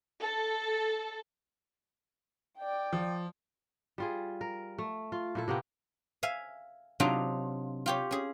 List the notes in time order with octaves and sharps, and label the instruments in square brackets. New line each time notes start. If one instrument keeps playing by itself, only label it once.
[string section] A4
[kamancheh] D5 G5
[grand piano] F3
[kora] G3 F4 G#4
A#4
A3
F4
A#2 E4 A4
C3 A#3 B3 G4
[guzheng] E5 F5 G#5
C3 F#3 D4 D#4 F4
F4 G4 C#5
C#4 G#4